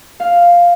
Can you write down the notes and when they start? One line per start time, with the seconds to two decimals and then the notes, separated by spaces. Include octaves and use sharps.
0.20 F5